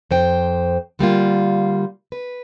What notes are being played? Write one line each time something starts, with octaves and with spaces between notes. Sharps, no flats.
F2 C5 G5
D3 G3 A#3 F4
B4